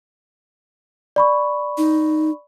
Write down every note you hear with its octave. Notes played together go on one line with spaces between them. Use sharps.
D5 B5 C#6
D#4